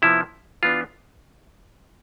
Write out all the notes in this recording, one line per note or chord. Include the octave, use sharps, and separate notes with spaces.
C3 F3 B3 E4
E3 B3 D4 F4